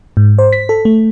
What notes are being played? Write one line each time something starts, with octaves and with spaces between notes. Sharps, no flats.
G#2
C5
B6
A4
A3